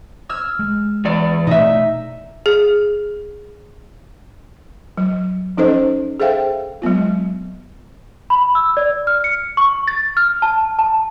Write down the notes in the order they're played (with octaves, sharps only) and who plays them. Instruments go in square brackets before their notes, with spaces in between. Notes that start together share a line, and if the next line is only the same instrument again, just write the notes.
[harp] E6 F6 G#6
[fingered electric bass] G#3
[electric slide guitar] E2 D5
[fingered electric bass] B2 A3 [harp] D#4 E5
[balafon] G#4
F#3
F3 C#4 D#4 A4 C5 D#5
G#4 A4 C5 E5 F5 G5
F#3 G#3 B3 F4
[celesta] B5
E6
D5
F6
C#7
C#6
A6
F6
A5
A5